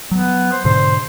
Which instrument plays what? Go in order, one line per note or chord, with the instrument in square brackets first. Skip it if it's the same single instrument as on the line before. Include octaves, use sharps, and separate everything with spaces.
[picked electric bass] F#3 [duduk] B3
[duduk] C5
[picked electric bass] G#2 B2 D3 [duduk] C5